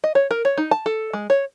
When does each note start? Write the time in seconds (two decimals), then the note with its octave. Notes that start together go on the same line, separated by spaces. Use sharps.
0.04 D#5
0.15 C#5
0.31 A#4
0.45 C#5
0.58 D#4
0.71 A5
0.86 A4
1.13 G#3
1.30 C#5